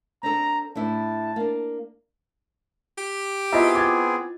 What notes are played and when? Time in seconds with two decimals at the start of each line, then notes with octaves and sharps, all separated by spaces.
0.23 C4 D4 A4 A#5
0.75 A2 D4 E4 A5
1.36 A#3 D4
2.98 G4
3.52 B3 C4 E4 F4 G#4 D#5 E5
3.75 D6 G#6 A6